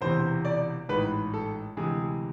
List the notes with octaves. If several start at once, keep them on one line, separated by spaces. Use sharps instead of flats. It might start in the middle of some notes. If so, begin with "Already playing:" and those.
E1 E2 C3 E3 C5
D5
A1 G#2 G#3 B4
A4
D2 C3 E3 G#3 G#4